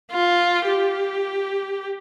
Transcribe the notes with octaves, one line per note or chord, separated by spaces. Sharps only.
F4
G4